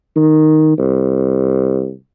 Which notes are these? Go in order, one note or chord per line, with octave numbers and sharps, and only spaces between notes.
D#3
C2